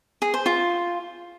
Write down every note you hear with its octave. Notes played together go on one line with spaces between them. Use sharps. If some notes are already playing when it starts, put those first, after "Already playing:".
G#4
C5
F4